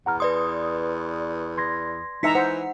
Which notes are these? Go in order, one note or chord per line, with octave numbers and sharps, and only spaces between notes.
E2 F#5 A#5 F6
B4 D5 C6 D#6
C6 G#6 A#6
E3 D#4 E5 A#5 B6 C#7
C5 F#5